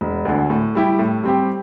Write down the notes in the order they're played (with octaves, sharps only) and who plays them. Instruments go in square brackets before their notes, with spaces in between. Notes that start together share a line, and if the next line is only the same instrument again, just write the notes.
[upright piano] E1
D2 D3
A2
G3 E4 G4
A2
G3 C4 G4